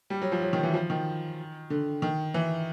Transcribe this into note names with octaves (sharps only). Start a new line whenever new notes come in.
G3
F#3
F3
F#3
D#3
E3
F3
D#3
D3
D#3
E3